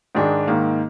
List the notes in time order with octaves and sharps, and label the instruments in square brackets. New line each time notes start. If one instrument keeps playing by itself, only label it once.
[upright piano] G#2 D#3 G#3 D4 G#4
G#2 D#3 A#3